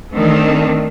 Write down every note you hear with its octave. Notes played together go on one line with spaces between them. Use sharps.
D#3 A3 C4 D4